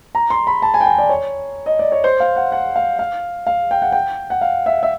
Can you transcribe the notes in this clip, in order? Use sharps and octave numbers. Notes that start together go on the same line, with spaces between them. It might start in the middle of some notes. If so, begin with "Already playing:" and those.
A#5
C6
B5
A5
G#5
G5
G#5
D5
C#5
D#5
D5
C#5
C5
F5
F#5
F#5
F5
F5
F5
G5
F#5
G5
F#5
F5
E5
E5